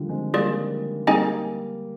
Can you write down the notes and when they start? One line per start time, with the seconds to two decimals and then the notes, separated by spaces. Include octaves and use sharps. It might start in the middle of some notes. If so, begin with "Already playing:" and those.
Already playing: D3 D#3 F3 G3
0.09 G#3 C4
0.34 G3 A#3 F4 G#4 D5
1.07 G3 A#3 C4 D#4 G#4 D#5 G#5